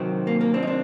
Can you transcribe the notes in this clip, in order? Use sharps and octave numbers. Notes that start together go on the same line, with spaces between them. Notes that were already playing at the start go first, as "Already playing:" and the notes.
Already playing: C3 D#3 F#3 C4
A#3
A#3
C4 D4
D#4
C4 D4